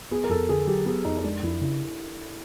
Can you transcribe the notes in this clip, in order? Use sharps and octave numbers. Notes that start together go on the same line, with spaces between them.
B3 G#4
A#4
F2 A4
D3 G#4
F#3 G4
B3 G#4
F2 D#4
D#4
G#3 D4
F2 E4
C#3 E4